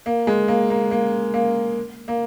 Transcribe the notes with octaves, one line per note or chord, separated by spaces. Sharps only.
A#3
G#3
A#3
A#3
A#3
A#3
A#3